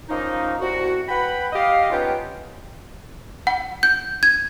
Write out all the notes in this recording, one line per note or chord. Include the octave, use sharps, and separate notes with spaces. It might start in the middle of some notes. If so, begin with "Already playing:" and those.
F3 A#3 C#4 D#4
C2 F#4
B4 F#5 G5 B5
G4 D#5 F5
B3 C#4 D#4 F4 G4 G5
F#5
G6
G#6